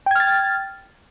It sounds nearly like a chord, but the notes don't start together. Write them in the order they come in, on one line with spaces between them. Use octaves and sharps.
G5 G#6 F6 A6